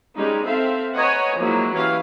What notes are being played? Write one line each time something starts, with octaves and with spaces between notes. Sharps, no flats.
G3 G#3 C#4 D#4
C4 A4 E5 F5
B4 C#5 D#5 F#5 G#5 A#5
F3 F#3 G#3 A#3 E4
E3 C#4 E4 G4 F5